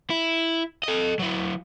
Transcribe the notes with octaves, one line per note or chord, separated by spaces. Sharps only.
E4
A4 D#5
F#3 E4